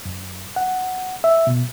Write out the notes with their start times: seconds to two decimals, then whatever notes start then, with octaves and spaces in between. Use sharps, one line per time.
0.05 F#2
0.56 F#5
1.24 E5
1.47 B2